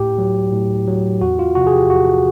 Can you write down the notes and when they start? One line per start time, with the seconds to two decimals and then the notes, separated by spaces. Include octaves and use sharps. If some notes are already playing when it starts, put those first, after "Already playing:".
Already playing: A2 G4
0.18 F#3
0.53 A2
0.88 F#3
1.21 E2 F#4
1.39 F4
1.55 C3 F3 F#4
1.67 G#4
1.73 G4
1.90 E2 F#4